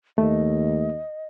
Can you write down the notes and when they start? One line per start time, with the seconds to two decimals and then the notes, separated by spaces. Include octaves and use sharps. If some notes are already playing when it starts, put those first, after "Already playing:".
0.18 D#2 A3 D#5